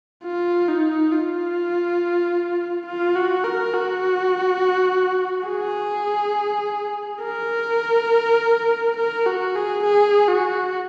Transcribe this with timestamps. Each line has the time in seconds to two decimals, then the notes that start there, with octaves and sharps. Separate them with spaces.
0.24 F4
0.69 D#4
1.12 F4
2.86 F4
3.16 F#4
3.44 A#4
3.74 F#4
5.48 G#4
7.22 A#4
8.97 A#4
9.26 F#4
9.55 G#4
9.84 G#4
10.28 F#4